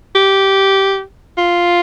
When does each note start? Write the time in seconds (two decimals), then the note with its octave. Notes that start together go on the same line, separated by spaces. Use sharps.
0.15 G4
1.38 F4